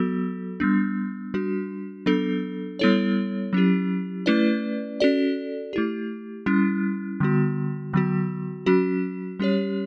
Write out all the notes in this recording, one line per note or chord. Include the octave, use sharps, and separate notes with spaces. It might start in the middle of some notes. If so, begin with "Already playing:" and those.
Already playing: F#3 B3 F#4 A4
G3 B3 D4
G3 D4 F#4
F#3 B3 D4 A4
G3 B3 E4 A4 C#5
F#3 C#4 E4 G4
A3 C#4 E4 B4 D5
C#4 F#4 A4 D5
A3 E4 G4
G3 C#4 E4
D3 G3 B3 F#4
D3 F#3 B3 F#4
F#3 C#4 F#4
G3 C#4 G4 C#5